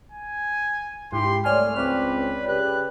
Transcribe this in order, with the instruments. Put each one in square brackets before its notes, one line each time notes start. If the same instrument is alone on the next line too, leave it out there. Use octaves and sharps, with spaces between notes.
[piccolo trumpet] G#5
[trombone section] C#2 E4 G4 [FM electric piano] G#2 [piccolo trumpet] C6
[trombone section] C2 [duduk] A3 [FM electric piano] C#5 D5 G#5 [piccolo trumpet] F6
[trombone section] C#2 [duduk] C4 [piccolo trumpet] B4 [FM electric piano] C#5 D5
[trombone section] C#3 G4 [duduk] B4 [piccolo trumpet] F#6